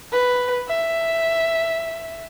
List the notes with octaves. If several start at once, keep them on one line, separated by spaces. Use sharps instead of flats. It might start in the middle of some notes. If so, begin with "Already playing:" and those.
B4
E5